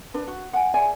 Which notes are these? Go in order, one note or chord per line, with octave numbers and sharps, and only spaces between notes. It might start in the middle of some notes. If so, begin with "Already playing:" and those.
D4 B4
F#4
F#5 G#5
G#4 D5 E5 G#5